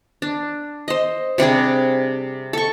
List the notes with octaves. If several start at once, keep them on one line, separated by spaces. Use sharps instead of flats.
D4
C5 D#5
C3 G3 D4 G#4
A4 C#6